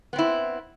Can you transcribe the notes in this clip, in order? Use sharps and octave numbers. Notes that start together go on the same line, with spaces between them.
B3 C4 E4